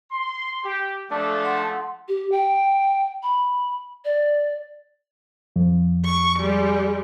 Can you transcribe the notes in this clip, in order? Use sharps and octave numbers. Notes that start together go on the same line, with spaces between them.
C6
G4
F3 G#3 A3 D4 D5
F#5 C6
G4
G5
B5
D5
F2
C#6
G3 G#3